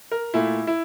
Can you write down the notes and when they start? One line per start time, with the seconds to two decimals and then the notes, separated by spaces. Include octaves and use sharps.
0.11 A#4
0.34 A#2 A3 E4
0.67 E4